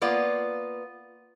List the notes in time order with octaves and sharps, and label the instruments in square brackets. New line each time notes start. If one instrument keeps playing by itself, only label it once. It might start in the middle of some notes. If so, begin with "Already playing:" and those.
[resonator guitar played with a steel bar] A#3 B3 F4 D5